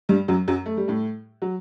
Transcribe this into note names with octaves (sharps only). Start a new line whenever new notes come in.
G2 G3
F#2 F#3
F#2 F#3
A3
G3
A2 A3
F#3